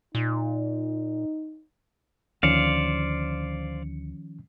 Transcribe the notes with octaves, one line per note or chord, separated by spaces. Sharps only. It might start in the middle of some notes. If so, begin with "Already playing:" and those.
A#2 D#4
D2 D#3 F3 C#4 C5 D5 F5 C#7